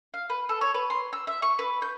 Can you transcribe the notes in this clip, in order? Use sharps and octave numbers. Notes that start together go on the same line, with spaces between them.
F5
B4
A4
C#5
B4
C6
E6
E5
C#6
B4
G6